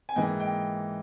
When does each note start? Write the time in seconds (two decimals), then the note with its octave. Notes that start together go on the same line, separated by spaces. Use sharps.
0.09 G#5
0.16 G#2 E3 A#3 D#5 G5
0.40 D#5 G5